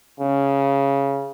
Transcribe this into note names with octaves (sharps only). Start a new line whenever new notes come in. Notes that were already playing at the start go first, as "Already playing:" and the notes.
C#3